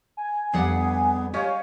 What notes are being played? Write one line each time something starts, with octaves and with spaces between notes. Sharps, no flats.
G#5
F2 G3 B3 D4 G#4 F#5
C#4 G4 C#5 D#5 F5